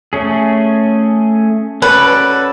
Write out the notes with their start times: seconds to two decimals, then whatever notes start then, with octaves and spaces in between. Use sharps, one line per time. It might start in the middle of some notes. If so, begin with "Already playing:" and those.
0.13 A3 C#4 G#4
1.82 C#4 F#4 A4 B4 D5